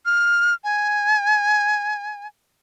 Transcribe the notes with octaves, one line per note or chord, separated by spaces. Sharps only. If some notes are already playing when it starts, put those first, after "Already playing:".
F6
G#5